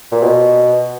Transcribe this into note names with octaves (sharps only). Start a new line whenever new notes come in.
A#2
B2